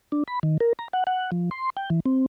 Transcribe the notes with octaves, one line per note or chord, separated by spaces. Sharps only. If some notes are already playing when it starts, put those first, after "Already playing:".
D4
B5
D#3
A#4
A#5
F#5
F#5
F3
C6
G5
E3
C4